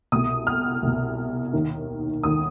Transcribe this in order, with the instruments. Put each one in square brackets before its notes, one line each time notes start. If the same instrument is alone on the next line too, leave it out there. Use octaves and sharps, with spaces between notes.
[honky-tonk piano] C2 B2 D#6
F6
C2 B2
D#2 D#3
D#2 D#3 D#6